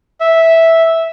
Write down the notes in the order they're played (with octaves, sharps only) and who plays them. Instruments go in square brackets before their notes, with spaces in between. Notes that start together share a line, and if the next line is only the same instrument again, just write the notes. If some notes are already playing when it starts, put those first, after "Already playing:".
[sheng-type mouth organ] E5